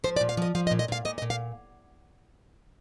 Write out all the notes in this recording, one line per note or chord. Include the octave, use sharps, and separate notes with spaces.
F3 C5
D5
A#2
F5
F3 D#5
F3 F5
D#5
A#2
D#5
A#2 F5
A#2 D#5
D#5
A#2
F5